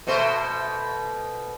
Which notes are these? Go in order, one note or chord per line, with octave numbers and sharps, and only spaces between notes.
B2 A3 C5